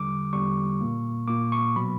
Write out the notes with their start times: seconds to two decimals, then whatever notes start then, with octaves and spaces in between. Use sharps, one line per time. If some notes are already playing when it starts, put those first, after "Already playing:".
Already playing: E2 D3 G3 D6
0.33 E2 D3 G3 C#6
0.81 A#2 A#3
1.28 A#2 A#3 D6
1.52 C#6
1.76 B2 F#3 B3 B5